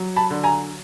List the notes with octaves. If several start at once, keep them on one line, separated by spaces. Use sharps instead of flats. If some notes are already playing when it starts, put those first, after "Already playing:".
Already playing: F#3
A5 B5
D3
G#5 A#5